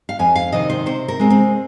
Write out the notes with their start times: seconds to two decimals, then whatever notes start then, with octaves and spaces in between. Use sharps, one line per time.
0.09 F5
0.19 F2 G#5
0.36 F5
0.52 C3 D#3 C4 D#5
0.70 C5
0.86 C3 C5
1.08 A#4
1.19 G#3 C4
1.30 C4